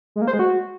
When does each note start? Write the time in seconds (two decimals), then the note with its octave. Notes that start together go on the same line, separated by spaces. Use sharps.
0.16 G#3
0.22 A#3
0.27 C5
0.33 G#3
0.39 F#4